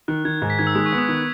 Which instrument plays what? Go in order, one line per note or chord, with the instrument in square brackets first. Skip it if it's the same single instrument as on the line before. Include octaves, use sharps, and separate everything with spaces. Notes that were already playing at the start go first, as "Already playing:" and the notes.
[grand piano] D#3 [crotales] F#6
[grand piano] D#3 [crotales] G#6
[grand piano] G#2
[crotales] B6
[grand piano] D#3 [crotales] G#6
[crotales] E6
[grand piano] G#3 [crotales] D#6
[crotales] C#6
[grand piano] B3
[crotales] D#6
[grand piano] D#3